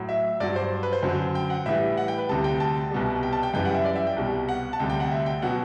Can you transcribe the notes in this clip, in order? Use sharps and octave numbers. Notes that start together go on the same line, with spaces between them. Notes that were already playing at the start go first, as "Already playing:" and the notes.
Already playing: A2 F#3
E5
G2 F#3 D5
C5
B4
C5
F#2 D3 F#3
G5
F#5
A2 E3 G3 E5
F#5
G5
B4
D2 C3 G3 A5
G5
A5
C2 B2 G3
G5
A5
G5
F#2 E3 G3 G5
F#5
E5
D5
E5
G5
C2 B2 G3
F#5
A5
D2 C3 G3 G5
G5
F#5
E5
G5
B2 F#3 F#5